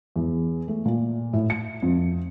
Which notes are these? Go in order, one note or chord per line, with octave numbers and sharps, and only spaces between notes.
E2
A3
A#2
A2
C#7
F2